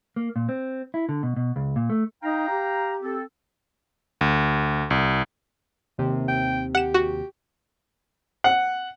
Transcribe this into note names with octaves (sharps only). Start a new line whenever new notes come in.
A#3
A#2
C4
E4
D3
B2
B2
C#2
A#2
A3
D#4 F5 G5 A#5
G4
C4 A4
D2
C2
D#2 C3
G5
G4 F#5 E7
F#4
F#5